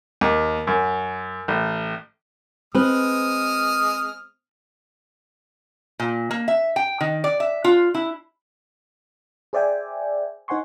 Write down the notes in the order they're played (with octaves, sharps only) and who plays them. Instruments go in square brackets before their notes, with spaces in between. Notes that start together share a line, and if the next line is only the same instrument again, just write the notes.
[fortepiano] D#2
F#2
A1
[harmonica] G#3 D#6 F6 [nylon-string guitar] C4 B4
[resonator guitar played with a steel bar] A#2
A#3
E5
G5
D#3
D5
E5
F4
E4
[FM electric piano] G#4 C5 D5 E5 G5 G#5
D#4 C5 F#5 G#5 C6 C#6